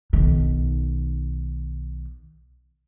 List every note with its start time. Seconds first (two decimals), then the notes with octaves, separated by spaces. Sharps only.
0.13 B1 D#3